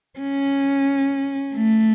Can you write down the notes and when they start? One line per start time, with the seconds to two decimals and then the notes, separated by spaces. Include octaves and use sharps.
0.19 C#4
1.54 A3